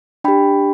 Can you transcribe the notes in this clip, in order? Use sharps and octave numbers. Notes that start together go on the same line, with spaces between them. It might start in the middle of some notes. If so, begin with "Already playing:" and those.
D4 G4 G5 B5